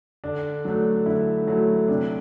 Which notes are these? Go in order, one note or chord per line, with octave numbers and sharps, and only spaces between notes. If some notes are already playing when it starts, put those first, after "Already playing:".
D3 D4
F#3 A3
D3 E4
F#3 A3
C3 D4